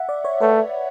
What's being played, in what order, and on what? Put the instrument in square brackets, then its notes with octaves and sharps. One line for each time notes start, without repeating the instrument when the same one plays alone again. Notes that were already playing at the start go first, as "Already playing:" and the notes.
Already playing: [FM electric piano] E5 F#5
D5
C#5
[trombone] A3 [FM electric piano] B4